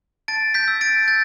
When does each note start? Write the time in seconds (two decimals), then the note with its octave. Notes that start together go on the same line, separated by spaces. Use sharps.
0.28 A5 A6 D7
0.54 G6 B6
0.68 E6
0.81 A6 D7
1.08 G6 A6